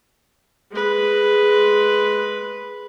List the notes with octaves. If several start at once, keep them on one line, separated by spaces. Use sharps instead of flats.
G#3 B4